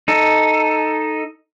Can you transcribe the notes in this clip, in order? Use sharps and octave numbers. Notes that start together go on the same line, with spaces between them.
D#4 A4